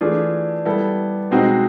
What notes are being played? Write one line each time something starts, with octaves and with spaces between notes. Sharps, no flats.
E3 A3 D4 F4 G#4
G3 B3 E4 A4
B2 G#3 C4 D#4 F#4